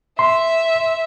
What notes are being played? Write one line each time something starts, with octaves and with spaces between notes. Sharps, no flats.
E5 C6